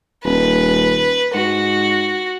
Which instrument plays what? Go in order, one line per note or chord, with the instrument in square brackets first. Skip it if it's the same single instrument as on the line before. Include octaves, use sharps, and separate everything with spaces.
[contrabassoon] D#1 [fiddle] B4
[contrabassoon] G#2 [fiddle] F#4